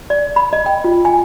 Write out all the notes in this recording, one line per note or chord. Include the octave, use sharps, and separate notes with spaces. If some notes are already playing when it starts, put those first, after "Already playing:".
D5
B5
D#5
G5
F4
G#5